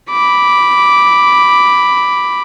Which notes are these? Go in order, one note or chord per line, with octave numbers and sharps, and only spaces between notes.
B5 D6